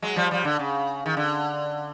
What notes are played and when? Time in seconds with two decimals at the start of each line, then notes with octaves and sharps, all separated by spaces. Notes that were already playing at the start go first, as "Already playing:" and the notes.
0.02 F#3 G#3
0.16 F3 G3
0.31 F3 G3
0.45 D3
0.59 C#3
1.06 D#3
1.17 D3